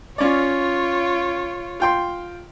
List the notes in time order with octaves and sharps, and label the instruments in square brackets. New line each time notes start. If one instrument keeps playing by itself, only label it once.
[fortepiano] C#4 D5 [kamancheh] F4 C#5
[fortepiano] F4 G5 C6